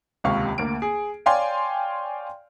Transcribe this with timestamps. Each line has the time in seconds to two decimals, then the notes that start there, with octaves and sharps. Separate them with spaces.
0.24 D#1 C#2 C3 F5 C#6
0.58 D2 A#3 D7
0.82 G#4
1.26 C#5 D5 F5 G5 G#5 C6